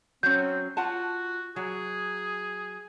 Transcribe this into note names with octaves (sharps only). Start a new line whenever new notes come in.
F#3 C4 C#4 G6
F4 F#4 F#5 A5
F#3 G#4